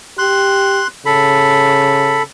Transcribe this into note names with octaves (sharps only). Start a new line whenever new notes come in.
G4 C6 F#6
C#3 A4 B5